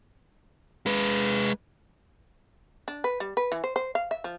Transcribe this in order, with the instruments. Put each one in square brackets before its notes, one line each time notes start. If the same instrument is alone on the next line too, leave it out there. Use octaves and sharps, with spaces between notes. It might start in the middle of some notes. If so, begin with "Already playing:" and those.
[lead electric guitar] G#3 B4
[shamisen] D4
B4
G3
B4
E3
C5
C5
F5
E5
F3